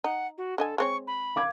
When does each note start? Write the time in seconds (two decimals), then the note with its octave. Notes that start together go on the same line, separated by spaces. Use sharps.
0.04 D#4 F#5
0.38 F#4
0.58 D3 A4 D#5 G#5
0.78 G#3 C4 C#5 C#6
1.07 B5
1.36 F5 D6 G#6